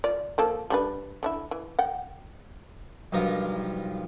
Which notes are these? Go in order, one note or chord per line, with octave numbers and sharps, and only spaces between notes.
F4 D5
F3 A#3 A4
G3 D4 B4
D3 D4 E4
E3
F#5 G5
B1 G2 F3 A#4